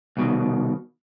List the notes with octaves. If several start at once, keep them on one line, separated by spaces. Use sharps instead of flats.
C2 B2 D#3